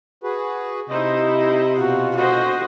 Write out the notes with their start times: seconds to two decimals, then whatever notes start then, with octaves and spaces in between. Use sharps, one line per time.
0.24 F#4 G#4 B4
0.90 C3 D#4 E4 C5 D#5
1.77 B2 F4 F#4
2.16 D3 F#4 C5 D#5